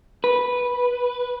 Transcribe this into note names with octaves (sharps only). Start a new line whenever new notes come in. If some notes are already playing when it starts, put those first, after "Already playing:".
B4